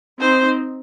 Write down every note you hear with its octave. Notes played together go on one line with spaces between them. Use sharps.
C4 D#4 C5